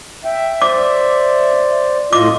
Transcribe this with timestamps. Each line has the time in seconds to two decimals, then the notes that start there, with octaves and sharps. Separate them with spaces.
0.25 E5 G5
0.62 C5 D5 D6
2.13 A2 F4 D#5 D6